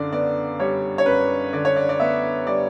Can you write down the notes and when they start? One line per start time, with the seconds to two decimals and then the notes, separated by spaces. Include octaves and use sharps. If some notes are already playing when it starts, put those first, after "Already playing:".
Already playing: F#2 D3 D5
0.12 B3 D5
0.59 G3 C#5
0.98 C#5
1.06 F#2 B4
1.53 D3 D5
1.65 C#5
1.76 D5
1.89 D5
2.00 B3 E5
2.47 G3 D5